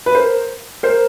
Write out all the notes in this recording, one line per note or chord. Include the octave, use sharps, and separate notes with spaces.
B4
A#4 C5
A#4 C5